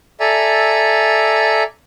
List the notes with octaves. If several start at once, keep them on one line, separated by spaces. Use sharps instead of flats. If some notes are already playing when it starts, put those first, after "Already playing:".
A4 D5 E5 G#5 A#5